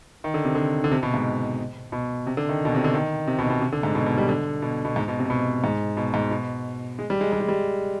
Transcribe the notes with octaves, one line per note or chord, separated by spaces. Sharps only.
D#3
D3
C3
D3
D3
C3
B2
G#2
B2
C3
D3
D#3
B2
C3
D3
D#3
C3
B2
B2
C3
D3
G#2
B2
B2
G3
D3
B2
B2
G#2
B2
C3
B2
G#2
B2
G#2
B2
G#3
G3
G#3
G3
G#3
G3